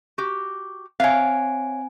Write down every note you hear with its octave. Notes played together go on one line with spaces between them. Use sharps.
F#4 G4
C4 C#5 E5 F5 G#5